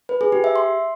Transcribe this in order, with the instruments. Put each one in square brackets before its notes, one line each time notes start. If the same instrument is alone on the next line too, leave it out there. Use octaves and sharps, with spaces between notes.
[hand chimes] B4
G#4
G4
E5
C6